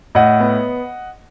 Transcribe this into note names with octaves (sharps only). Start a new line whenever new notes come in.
A2 D#5 F#5
B3